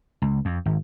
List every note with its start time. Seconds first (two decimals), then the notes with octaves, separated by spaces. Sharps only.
0.22 C#2
0.45 F2
0.66 G#1